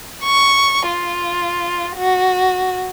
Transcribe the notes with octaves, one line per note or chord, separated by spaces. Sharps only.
C#6
F4
F#4